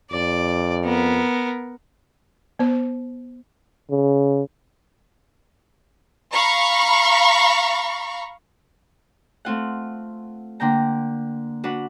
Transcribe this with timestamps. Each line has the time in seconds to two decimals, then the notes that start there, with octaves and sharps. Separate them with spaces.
0.12 F2 D5
0.84 B3 A#4
2.59 B3 C5
3.90 C#3
6.33 F5 A#5 B5 C#6
9.45 A3 C4 F4 F#5
10.60 D3 A#3 G5 A#5
11.64 D4 F#4 B4 F#5